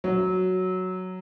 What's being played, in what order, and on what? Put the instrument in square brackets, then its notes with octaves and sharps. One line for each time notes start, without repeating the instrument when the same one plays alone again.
[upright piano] F#3